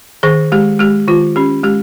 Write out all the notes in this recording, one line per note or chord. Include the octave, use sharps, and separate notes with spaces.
D#3 G#4
G#3 G4
G#3 G4
D#3 F4
C#4 G4
G#3 G4